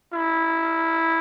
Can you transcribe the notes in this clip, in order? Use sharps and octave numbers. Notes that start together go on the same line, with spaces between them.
E4